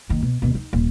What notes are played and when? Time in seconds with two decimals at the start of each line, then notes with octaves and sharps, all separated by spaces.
0.09 F#1 D#3
0.22 B2
0.42 D#2 B2
0.55 D#4
0.73 D#1